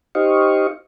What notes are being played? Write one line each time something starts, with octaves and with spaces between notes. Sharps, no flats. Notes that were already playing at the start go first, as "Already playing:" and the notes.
D#4 G4 C5 D#5 F5 C#6